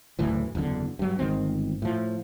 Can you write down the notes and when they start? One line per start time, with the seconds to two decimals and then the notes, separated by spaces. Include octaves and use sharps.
0.19 F#1 D2 A2 E3
0.55 F#1 E2 A2 D3
0.99 G2 F#3
1.19 G1 G#2 D#3 C4
1.82 A2 F3